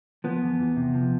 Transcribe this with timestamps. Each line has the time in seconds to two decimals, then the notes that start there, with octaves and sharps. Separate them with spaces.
0.24 F3 B3
0.41 E2
0.59 E2
0.76 C3
0.94 F3